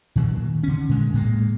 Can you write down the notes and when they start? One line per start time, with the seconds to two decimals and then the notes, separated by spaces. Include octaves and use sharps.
0.16 A#2 D#3 F#3
0.63 D3 C#4
0.89 A#2 G#3
1.13 A2 G#3 A#3